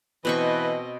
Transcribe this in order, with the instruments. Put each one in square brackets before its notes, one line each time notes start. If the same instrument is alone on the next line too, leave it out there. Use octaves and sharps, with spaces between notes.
[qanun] B2 C4 C#6 [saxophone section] E3 B4 [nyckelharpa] D#5